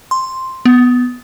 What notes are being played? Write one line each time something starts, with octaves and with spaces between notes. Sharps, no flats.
C6
B3